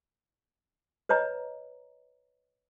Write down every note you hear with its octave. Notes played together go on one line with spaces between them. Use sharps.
B4 C#5 D#5 A#5